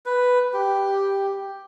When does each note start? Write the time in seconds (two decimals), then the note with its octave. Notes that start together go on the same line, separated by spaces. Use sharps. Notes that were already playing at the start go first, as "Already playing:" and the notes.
0.06 B4
0.53 G4